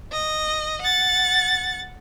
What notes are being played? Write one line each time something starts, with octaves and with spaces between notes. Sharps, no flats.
D#5
F#5 A6